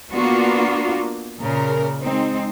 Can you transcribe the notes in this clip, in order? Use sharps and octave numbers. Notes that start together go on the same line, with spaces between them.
A#3 B3 D4 F4 F#4
A#2 C#3 A#4
G#3 C4 D#4